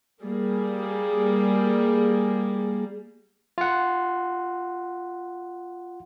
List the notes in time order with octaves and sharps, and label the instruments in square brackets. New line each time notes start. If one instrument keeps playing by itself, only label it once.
[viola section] G3 A#3 G#4
[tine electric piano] F4 F#5